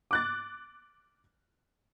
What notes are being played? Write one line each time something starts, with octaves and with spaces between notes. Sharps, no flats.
D6 F#6 A6